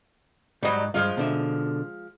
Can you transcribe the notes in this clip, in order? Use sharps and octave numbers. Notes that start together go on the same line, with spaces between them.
G#2 F#3 G3 D#5
G2 F3 G#3 F4
B2 D3 E5